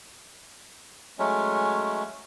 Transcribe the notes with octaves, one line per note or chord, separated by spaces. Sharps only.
F#3 G#3 A3 C#4